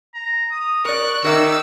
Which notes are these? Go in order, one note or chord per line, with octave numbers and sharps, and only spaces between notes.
A#5
D#6
A#4 D5 C#6 F#6
D#3 A#4 E5 D6 E6